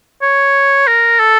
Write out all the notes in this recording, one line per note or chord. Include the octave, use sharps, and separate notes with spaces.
C#5
A#4
A4